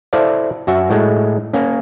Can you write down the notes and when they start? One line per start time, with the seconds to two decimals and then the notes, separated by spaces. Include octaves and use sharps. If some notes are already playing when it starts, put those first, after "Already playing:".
0.13 E4 A4 C5 D5 F5
0.67 F#2 F#4 E5
0.90 A2 G#3 A3
1.53 A#3 C#4